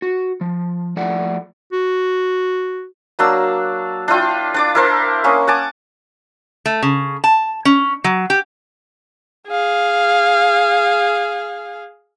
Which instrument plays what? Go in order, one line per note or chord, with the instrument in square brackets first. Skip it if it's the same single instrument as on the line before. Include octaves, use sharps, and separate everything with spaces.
[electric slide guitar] F#4
F3
F3 A3 D5 F#5
[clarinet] F#4
[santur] F#3 A#3 D4 E6
D4 E4 F4 G5
D4 D5 D6
E4 A#4 C5
A#3 C#4 C#6 D#6
F#5 G#5 A5 D6
[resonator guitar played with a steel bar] A3
C#3
A5
C#4
F#3
G4
[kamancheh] G#4 F5